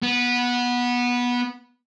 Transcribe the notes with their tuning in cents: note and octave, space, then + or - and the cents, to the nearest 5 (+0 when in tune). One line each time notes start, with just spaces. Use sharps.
B3 -15